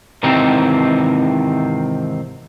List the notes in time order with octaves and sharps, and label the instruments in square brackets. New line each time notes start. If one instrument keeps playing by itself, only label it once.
[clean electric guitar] G#2 C3 D#3 E3 C4 D#4